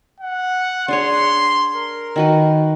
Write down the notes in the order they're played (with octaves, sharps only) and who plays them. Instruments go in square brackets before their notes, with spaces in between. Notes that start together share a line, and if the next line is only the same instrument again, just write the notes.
[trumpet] F#5
[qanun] D4 G#4 C#5 [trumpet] C6
[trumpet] A#4
[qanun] D#3 F#4 B4